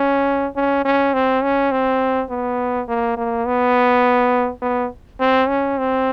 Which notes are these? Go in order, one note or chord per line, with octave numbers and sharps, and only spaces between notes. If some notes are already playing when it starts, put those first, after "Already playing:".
Already playing: C#4
C#4
C#4
C4
C#4
C4
B3
A#3
A#3
B3
B3
C4
C#4
C4